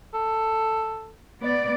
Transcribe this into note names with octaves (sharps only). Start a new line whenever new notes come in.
A4
B3 D5